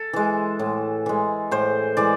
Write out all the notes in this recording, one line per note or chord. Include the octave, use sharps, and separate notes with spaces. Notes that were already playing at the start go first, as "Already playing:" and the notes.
Already playing: A4
E3 G#3
A2
E3 G#3
A2 C5
E3 G#3 D5